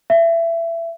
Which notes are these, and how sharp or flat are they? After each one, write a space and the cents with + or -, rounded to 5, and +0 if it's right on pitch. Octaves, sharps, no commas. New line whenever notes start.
E5 +25